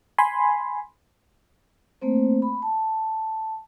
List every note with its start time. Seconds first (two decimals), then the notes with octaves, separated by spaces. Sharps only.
0.18 G#5 B5 C6
2.02 A3 A#3 C4 C5
2.42 B5
2.62 A5